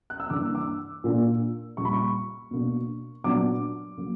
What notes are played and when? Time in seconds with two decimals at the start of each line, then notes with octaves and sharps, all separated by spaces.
0.10 F#6
0.20 E6
0.30 G2 E3 A#3 D4 D6
0.55 D6
1.04 A#2 A#3 D4
1.77 A#2 G3 A#3 C#6
1.85 B5
1.93 C#6
2.51 B2 A#3 D4
3.24 A#2 F#3 B3 D4 D6
3.98 F#3 A#3